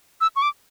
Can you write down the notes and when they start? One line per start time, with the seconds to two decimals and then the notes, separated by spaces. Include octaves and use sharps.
0.21 E6
0.36 C#6
0.42 D6